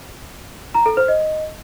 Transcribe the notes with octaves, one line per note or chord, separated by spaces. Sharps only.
A#5
A4
C5
D#5